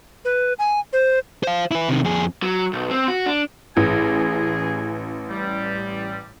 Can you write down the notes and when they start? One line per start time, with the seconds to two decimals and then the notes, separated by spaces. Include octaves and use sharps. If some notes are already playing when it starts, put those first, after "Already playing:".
0.25 B4
0.59 G#5
0.93 C5
1.43 C5 F5
1.71 E4 B4
1.89 C3 D#3
2.04 F2 G#4
2.43 F#3
2.73 B1
2.91 C4
3.08 F#4
3.26 D4
3.76 A1 E3 G#4 G#5
5.30 G3